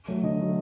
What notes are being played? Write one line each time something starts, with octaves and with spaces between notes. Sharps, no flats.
F#3 A3
D3 D#5
F#3 A3